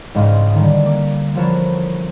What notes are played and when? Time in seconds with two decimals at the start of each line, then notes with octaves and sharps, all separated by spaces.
0.15 C#2 G#2 E3 D#5 F5 C6
0.54 D3 D#3 G3
0.85 A#3 D6
1.35 E3 F3 B3 A4 A#4 C#5